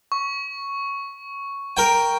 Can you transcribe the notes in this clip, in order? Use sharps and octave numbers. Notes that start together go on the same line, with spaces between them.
C#6
A#4 G5